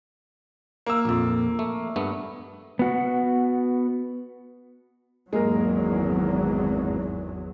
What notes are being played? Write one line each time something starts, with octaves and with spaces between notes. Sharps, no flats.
A#3 E6
A#1 F2
A3
G2 A3 B3
B3 F#4
G#1 E2 F#3 G#3 A#3 A#4